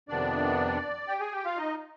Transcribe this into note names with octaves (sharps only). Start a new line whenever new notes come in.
F2 C3 D#3 B3 D4 D5
G4 G5
G#4 G#5
G4 G5
F4 F5
D#4 D#5